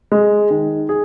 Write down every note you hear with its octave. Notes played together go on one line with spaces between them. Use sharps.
G#3
D#3
G#4